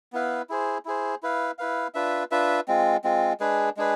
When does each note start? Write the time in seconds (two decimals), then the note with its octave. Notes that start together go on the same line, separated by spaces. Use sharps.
0.13 B3 E4 B4 F5
0.49 E4 G#4 C5
0.85 E4 G#4 C5
1.23 E4 B4 F5
1.58 E4 B4 F5
1.94 D4 F4 B4 E5
2.31 D4 F4 B4 E5
2.68 G#3 C4 F4
3.04 G#3 C4 F4
3.40 G#3 D4 G#4 B4
3.77 G#3 D4 G#4 B4